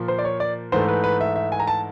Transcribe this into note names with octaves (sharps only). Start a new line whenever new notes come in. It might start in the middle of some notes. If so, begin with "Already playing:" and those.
Already playing: A#2 F3 A#3
C5
D5
C#5
D5
G#2 E3 A3 C5
B4
B4
E5
E5
G#5
A#5
A5